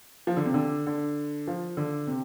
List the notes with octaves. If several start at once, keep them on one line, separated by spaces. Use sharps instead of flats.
F3
D3
C3
D3
D3
F3
D3
C3